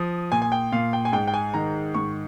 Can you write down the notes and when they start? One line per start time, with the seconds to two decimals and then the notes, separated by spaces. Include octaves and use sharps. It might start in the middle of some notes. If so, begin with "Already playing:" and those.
Already playing: F3 D#6
0.32 A#2 G#5
0.42 G#5
0.52 G5
0.72 A#2 F5
0.93 G5
1.05 G#5
1.13 G#2 G5
1.27 G5
1.34 G#5
1.54 D#3 A#5
1.95 G#2 C#6